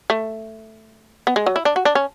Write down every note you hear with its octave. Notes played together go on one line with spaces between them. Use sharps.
A3
B3
G#3
F#3
E4
D4
F#4
D4
C#4